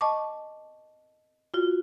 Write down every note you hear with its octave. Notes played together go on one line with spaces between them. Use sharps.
D#5 A5 C#6 D6
F4 F#4